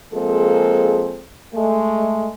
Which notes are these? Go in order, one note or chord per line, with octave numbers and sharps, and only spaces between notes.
F3 G#3 A#3 C4 G#4 A4
G#3 A3